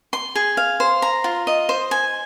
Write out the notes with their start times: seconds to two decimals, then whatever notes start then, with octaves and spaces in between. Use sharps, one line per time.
0.13 C6
0.35 G#4
0.57 F5
0.80 C5
1.02 A#5
1.24 F4
1.47 D#5
1.69 C5
1.91 G#5